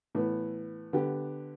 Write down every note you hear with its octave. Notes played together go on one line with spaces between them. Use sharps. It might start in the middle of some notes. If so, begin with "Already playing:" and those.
A2 E3 B3
D3 B3 G4